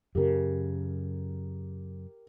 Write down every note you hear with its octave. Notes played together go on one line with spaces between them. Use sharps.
F#2 C#3 G4 A#4